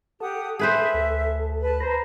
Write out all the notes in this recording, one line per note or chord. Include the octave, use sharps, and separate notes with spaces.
G4 A4 F#5 D#6
G#4 B4 C5 E5
D2
B4 A5
B4 C5 A#5